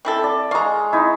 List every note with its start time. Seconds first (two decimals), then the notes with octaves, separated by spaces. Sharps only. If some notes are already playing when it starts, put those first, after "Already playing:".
0.05 C4 E4 A4
0.24 D5
0.51 G#3 F5 A#5 C#6
0.93 D#4 E4